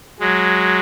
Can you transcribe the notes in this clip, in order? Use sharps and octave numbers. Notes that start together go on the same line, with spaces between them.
F#3 G#3